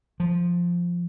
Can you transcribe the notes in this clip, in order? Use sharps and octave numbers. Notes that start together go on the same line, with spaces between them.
F3